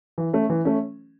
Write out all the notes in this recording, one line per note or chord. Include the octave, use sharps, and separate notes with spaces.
E3
A3 C#4
E3
A3 C#4